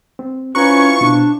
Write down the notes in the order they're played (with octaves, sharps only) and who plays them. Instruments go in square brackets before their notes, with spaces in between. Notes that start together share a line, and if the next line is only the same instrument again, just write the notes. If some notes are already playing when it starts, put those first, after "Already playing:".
[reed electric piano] C4
[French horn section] C4 E4 F4 [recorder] C#4 [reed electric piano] B4 A#5 F#6 [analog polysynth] C#6
[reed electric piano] B2 [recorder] D4